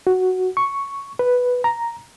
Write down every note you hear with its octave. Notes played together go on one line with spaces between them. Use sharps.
F#4
C#6
B4
A#5